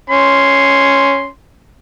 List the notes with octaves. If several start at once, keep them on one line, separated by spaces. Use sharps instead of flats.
C#4 C6